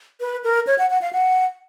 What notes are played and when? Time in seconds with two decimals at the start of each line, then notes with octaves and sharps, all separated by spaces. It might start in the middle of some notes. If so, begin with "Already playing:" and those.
0.20 B4
0.44 A#4
0.67 C#5
0.78 F#5
0.90 F#5
1.01 F5
1.13 F#5